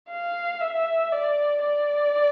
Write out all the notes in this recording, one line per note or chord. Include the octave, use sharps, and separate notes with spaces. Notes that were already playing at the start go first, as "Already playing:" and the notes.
F5
E5
D5
D5